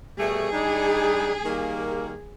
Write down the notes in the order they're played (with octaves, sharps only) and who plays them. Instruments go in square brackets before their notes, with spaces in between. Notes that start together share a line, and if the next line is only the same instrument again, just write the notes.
[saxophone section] B2 G3 A3 [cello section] G#4
[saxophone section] G3 D4 D#4
D#3 G3 A#3